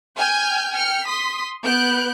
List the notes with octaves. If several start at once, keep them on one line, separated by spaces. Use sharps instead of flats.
G5 G#5 F6 G6
G5 F6 C#7
C6 D#6 B6
B3 F#6 G6 D7